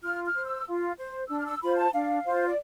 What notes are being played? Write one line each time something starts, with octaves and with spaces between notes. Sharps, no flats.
F4 F6
F6
C5
E6
F4
C5
D4 E6
F6
E6
F4 C5 B5
A5
D4 F5
F4 C5
D5